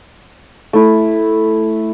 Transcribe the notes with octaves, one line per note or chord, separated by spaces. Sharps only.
A3 E4